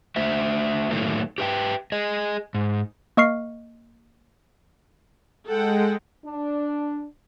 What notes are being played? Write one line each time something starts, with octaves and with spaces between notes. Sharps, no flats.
A3 D4 F#4 C5 E5
A2 D#3 F#3 A3 A#3
G4 B4 E5 G5
G#4 D#5
G#2
A#3 D#5 C#6 F6 C7
G#3 A4 F#5 G5
D4